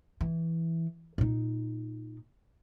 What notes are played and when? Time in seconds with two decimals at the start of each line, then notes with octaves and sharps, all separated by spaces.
0.21 E3
1.18 A#2 D#4